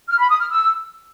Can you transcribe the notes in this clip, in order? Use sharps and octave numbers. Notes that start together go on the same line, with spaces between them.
F6
B5
D#6
F6
E6